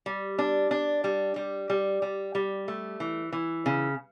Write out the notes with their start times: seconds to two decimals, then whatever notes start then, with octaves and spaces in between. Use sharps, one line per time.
0.06 G3
0.39 D4
0.71 D4
1.04 G3
1.36 G3
1.70 G3
2.02 G3
2.35 G3
2.68 A3
3.00 E3
3.33 E3
3.66 C#3